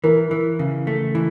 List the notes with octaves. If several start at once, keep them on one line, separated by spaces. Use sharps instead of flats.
E3 A#4
E3
C#3
A3
E3